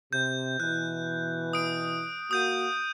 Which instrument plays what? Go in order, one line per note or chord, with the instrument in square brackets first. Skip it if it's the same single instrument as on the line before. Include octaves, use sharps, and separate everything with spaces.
[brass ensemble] C3 [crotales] G6
[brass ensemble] B2 E3 [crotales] F#6
[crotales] D#6 D7
[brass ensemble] A#3 F#4 [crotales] D#6 G6 D#7